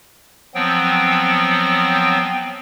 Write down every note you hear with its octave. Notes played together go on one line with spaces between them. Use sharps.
F3 F#3 B3 C4 G5